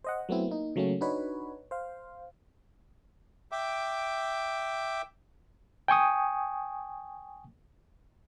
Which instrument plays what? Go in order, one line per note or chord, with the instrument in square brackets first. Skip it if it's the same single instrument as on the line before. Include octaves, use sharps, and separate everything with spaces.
[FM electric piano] C5 D#5 F#5
F#3 A3 B3 C4 E4
A#3 D#4
C#3 F#3 A3 A#3 C#4
D4 D#4 F#4 B4 C#5
C5 F5
[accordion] E5 G5 D6
[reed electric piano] G5 G#5 C#6 D#6